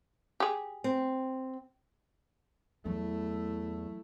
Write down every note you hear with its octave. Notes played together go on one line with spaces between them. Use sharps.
G4 G#4
C4
E2 E3 F#3 A3 E4